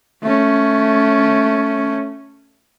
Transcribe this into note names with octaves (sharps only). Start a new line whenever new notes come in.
A3 C#4